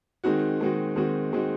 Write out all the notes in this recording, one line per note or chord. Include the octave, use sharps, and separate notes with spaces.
D#3 G#3 C4 D#4 F#4
D#3 G#3 C4 D#4 F#4
D#3 G#3 C4 D#4 F#4
D#3 G#3 C4 D#4 F#4